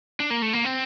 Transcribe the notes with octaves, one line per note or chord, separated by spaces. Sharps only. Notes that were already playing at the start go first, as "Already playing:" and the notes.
D4
A#3
A3
A#3
C4